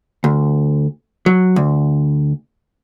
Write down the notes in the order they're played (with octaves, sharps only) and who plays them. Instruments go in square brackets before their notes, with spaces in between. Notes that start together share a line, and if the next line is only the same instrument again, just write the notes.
[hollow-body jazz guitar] D2
F#3
D2